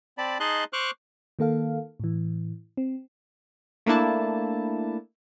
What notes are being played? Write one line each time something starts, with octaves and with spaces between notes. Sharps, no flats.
C4 D5 A5 B5
D#4 G#4 D#5 A5 C6 F#6
C5 C#6 D6 F6 F#6
D#3 A#3 A4 F5
A2 E3
C4
A3 A#3 D4 E4 A5